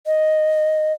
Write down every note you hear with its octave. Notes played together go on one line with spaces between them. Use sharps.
D#5